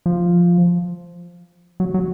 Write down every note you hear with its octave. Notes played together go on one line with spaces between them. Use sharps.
F3
F#3
F#3